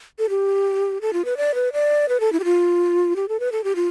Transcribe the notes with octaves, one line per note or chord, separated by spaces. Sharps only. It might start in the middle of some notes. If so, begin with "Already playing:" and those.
A4
G4
A4
F4
B4
D5
B4
D5
B4
A4
E4
G4
F4
G4
A4
B4
A4
G4
F4